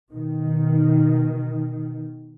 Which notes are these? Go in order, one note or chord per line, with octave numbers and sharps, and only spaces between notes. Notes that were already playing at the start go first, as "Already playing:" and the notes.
B2 D#3